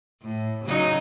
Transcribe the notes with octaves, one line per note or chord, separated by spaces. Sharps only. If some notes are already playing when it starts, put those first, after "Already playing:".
A2
C#3 F#3 D#4